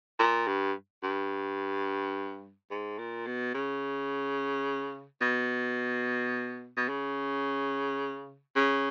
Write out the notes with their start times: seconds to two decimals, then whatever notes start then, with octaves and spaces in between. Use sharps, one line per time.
0.19 A#2
0.47 G2
1.03 G2
2.71 G#2
2.98 A#2
3.26 B2
3.54 C#3
5.21 B2
6.77 B2
6.89 C#3
8.56 C#3